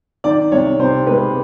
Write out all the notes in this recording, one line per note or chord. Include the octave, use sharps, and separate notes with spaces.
D#3 D5
C2 C#5
C3 C5
G#3 B4